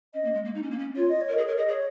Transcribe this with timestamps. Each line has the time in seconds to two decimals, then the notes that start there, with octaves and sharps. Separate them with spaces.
0.14 C#4 D#5
0.24 A#3
0.34 G#3
0.45 A#3
0.55 D#4
0.62 C#4
0.71 A#3
0.78 C#4
0.96 F4 C#5
1.09 D#5
1.21 C#5
1.29 A#4
1.33 G#4 D#5
1.46 A#4 C#5
1.57 G#4 D#5
1.68 G#4
1.70 C#5